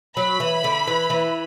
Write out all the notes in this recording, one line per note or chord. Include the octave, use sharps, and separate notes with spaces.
F#3 B5
E3
D3
E3
E3